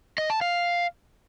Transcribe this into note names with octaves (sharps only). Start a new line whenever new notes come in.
D#5
A5
F5